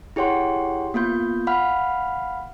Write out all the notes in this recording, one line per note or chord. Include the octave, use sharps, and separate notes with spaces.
E4 G4 G#4 C#5 F#5 C6
A#3 B3 F4 G6
F5 F#5 B5 F6